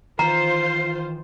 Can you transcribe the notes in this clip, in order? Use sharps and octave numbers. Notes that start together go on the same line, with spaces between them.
D#3 E3 F4 C5 A#5 C7